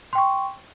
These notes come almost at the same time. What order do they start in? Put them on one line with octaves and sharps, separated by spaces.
C6 G5 C#6